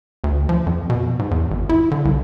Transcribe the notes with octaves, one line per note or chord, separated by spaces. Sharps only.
D2
F3
F2
B2
G#2
E2
G#1
E4
D3
C2